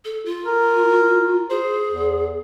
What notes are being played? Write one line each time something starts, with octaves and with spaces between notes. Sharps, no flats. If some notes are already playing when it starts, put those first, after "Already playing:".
A4
F4
A#4
G#4 C5
E2